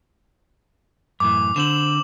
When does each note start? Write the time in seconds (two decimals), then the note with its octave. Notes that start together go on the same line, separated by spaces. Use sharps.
1.20 F#2 A2 E3 D6
1.56 D3 C4 E7 F#7